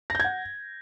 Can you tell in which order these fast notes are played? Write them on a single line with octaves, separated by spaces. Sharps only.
A#6 G6 G#6 F#5